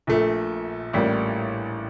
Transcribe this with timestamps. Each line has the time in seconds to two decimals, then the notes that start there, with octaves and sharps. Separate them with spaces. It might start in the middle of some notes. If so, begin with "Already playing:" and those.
0.07 A#1 A#2 A3
0.93 A1 A2 G3 A#3 F4